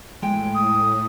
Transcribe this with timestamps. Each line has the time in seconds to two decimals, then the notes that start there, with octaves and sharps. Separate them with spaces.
0.22 A2 G#3 G5
0.54 D#6